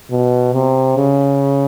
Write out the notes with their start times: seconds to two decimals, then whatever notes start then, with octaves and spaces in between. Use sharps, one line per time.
0.11 B2
0.53 C3
0.96 C#3